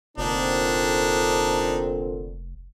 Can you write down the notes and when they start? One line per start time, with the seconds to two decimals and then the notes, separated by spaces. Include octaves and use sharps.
0.18 F1 A#2 D3 C4 D4 D#4